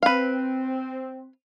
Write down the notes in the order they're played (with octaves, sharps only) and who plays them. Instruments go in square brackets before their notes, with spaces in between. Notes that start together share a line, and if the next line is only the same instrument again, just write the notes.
[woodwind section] C4 [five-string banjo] B4 F5